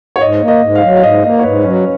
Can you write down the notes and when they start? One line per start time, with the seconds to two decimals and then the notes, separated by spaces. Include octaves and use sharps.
0.16 C#5
0.21 G#2 D#5
0.42 A#3
0.48 D#5
0.62 G#2
0.75 F5
0.82 F#3
0.96 F5
1.03 G#2 D#5
1.23 A#3 D#5
1.39 C#5
1.43 G#2 B4
1.64 F#3 C#4